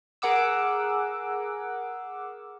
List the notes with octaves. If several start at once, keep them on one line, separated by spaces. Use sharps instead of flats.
G#4 A#4 F#5 D6 E6